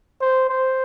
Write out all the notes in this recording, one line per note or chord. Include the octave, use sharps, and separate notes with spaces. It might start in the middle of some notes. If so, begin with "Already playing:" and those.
C5
C5